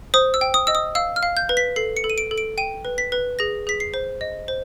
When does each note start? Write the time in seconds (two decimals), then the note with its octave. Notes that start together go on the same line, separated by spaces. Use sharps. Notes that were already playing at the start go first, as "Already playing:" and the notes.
0.14 C5 D#6
0.34 E6
0.41 G5
0.54 D#6
0.67 D#5 E6
0.75 D#6
0.95 F5 E6
1.16 F6
1.23 F5
1.37 G6
1.49 B4
1.57 B6
1.76 A4 C7
1.97 C#7
2.04 A4
2.10 D#7
2.18 D7
2.31 A4
2.38 D7
2.58 G5 D#7
2.85 B4
2.98 B6
3.12 B4
3.39 G#4 A#6
3.67 G#4 B6
3.80 C7
3.94 C5
4.21 D#5
4.48 C5